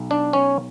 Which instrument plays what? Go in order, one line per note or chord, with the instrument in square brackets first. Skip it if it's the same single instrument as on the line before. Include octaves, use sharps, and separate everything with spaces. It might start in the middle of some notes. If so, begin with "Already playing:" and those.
Already playing: [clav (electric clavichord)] B1
D4
C#4